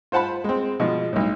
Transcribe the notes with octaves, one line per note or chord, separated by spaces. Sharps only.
F4 C5 F#5 A5 B5
G#3 C4
B2 F3 G#3
B1 A2